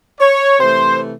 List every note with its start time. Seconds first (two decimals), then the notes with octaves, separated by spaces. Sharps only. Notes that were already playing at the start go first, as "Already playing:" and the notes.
0.20 C#5
0.59 C3 E3 A3 C5